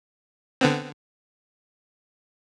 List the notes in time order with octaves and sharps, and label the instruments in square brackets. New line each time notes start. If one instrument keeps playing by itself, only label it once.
[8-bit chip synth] D3 B3 C4